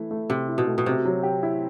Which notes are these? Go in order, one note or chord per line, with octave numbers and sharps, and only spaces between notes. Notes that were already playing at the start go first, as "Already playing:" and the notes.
Already playing: E3 A3 E4
A3
C3 G4
E4
B2
A3
B2
C3 C4
F#3
G4
E4